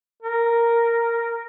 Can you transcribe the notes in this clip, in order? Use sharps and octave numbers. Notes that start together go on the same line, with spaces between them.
A#4